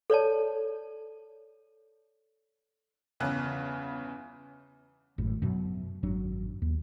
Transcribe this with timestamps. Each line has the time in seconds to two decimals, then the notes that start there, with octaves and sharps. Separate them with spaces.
0.10 A4 C#5 D5 A5
3.20 G1 E2 C#3 F#6
5.18 G#1 F#2 A2
5.42 F#2 B2 F#3
6.03 G#1 F#2 F#3 D4
6.62 D#2